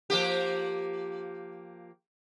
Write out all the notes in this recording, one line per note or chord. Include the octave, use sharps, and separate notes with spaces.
F3 A#3 G4